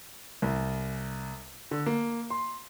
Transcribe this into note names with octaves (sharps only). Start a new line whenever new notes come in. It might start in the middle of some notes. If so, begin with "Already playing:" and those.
C2
D3
A#3
C6